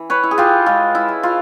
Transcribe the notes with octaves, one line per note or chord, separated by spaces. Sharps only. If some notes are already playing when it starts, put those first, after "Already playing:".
Already playing: E3
B4 C#5
E4
G#4
F4 G4
G#3 F4
E4
G#3
F4